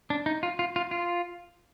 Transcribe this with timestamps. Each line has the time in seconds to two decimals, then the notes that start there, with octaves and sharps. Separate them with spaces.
0.10 D4
0.26 D#4
0.43 F4
0.59 F4
0.76 F4
0.91 F4